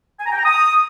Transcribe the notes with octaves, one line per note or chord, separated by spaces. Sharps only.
G#5
A#5
G5
A#5
D#6